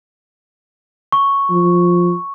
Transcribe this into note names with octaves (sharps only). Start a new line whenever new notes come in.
C#6
F3